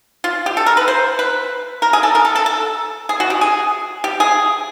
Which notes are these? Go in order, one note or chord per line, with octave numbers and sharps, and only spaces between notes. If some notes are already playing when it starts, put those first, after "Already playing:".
F4
G4
A4
A#4
B4
C5
B4
A#4
G#4
A4
A#4
A4
A4
A4
G#4
F#4
G4
G#4
G4
G#4